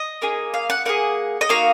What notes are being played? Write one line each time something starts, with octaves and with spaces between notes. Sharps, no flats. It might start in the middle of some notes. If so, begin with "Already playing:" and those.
Already playing: D#5
A#3 D#4 G#4
F5
F#5
A#3 D#4 G#4 F#5
D#5
A#3 D#4 F#4 F5